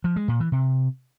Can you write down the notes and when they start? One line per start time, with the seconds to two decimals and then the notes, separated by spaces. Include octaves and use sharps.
0.04 F3
0.16 G#3
0.28 A#2
0.40 E3
0.52 C3